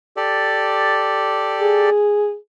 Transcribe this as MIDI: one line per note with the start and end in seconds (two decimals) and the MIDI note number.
0.17 1.90 67
0.17 1.90 69
0.17 1.90 74
1.61 2.36 68